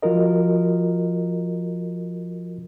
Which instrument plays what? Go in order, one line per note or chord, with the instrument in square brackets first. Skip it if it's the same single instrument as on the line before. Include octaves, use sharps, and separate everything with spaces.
[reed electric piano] F3 F4 F#4 A#4 D#5